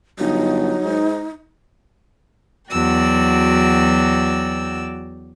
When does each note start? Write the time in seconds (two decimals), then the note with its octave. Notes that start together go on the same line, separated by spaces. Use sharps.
0.19 G1 F#3 D#4
0.85 G#2
2.71 E2 F#3 F#4 D5 G5 E6